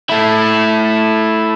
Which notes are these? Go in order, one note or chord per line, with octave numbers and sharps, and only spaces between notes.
A3 E4